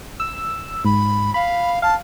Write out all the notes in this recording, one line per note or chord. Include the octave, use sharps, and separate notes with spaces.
E6
G#2 B5
F5 B5
F5 A5